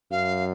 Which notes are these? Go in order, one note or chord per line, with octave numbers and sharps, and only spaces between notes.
F#2 F5